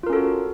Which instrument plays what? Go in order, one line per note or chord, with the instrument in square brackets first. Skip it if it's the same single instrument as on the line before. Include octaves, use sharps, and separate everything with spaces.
[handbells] F4
A#4
C#4
A4
F#4